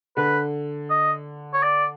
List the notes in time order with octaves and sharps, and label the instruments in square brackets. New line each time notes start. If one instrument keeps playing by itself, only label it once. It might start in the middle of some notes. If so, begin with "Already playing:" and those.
[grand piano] D3 [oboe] B4
[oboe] D#5
C#5
D5